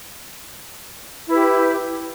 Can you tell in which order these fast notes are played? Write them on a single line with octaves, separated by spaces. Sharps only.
E4 B4 G4